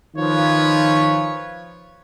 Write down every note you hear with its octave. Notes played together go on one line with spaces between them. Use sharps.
D#3 F3 F4 B4 C#5